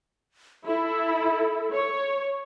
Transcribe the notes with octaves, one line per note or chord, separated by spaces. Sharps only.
E4 A4
C#5